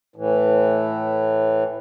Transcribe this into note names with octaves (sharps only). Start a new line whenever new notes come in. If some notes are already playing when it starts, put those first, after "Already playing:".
A2 E3